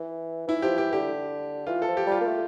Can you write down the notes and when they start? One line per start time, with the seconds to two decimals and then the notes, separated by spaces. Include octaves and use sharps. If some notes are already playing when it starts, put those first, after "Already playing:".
Already playing: E3
0.47 E3 E4
0.62 F3 G4
0.78 E3 G4
0.93 D3 G4
1.67 E3 F4
1.82 A4
1.88 F3
1.97 G4
2.07 G3 F4
2.21 A#3
2.26 A3